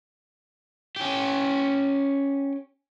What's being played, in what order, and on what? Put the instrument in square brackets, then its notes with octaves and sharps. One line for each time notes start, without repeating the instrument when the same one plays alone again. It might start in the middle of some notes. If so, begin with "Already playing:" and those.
[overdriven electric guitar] C#4 G4